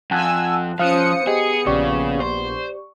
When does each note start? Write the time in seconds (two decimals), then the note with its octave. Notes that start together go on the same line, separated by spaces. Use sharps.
0.11 F2 F#5 G#5 A5 E6 F#6
0.79 F3 C#4 C5 F5 D#6 F#6 C#7
1.27 B3 G4 G#4 D#5
1.66 A#1 C#3 G4 D5 C#6
2.20 C5